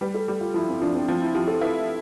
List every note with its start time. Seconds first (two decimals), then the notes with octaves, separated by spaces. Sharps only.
0.01 G3 B4
0.14 A4
0.28 G3 G4
0.41 F4
0.54 F3 E4
0.69 C4
0.82 F3 D4
0.95 C4
1.08 F3 C4
1.22 E4
1.35 F3 G4
1.47 A4
1.61 E4 B4